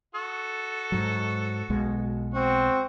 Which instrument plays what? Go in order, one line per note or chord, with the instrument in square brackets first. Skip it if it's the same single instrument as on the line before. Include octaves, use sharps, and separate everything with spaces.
[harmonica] F#4 A4
[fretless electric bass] G#2 F#3
B1 B2 G#3
[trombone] C4 [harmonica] F#4